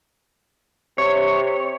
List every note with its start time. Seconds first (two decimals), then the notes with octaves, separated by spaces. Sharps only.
0.98 C3 C#5